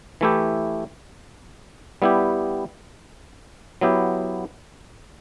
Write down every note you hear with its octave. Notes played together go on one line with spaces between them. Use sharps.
E3 A3 E4 G4
G3 B3 E4 G4
F#3 B3 E4 G4